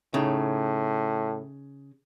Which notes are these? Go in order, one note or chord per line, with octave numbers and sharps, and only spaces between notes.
A2 C#3 D#4